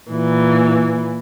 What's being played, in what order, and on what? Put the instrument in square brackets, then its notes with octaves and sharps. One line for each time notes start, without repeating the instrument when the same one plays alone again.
[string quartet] A#2 E3